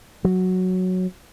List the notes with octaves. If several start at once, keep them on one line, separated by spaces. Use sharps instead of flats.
F#3